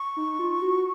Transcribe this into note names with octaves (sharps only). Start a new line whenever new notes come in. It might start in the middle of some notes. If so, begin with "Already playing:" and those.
Already playing: C#6
D#4
F4
F#4